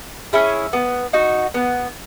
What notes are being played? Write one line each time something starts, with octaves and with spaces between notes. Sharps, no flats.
C#4 E4 G#4
B3
D#4 F#4
B3